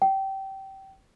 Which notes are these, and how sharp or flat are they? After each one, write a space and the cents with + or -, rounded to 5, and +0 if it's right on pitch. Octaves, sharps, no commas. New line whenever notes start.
G5 -20